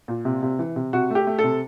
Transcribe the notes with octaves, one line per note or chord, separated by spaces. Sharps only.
A#2
C3
C3
E3
C3
C3 F#4
A3 G4
A3
A4
C3